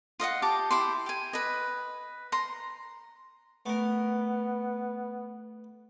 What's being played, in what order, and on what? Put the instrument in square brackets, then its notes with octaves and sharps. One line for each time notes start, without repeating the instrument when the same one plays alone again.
[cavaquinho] F4 D#5 F5 F#5
G4 A5 D6
E4 G4 C6
G4 G#5
B4 D#5
A#5 C6
[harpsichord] A3 A#4 [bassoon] B3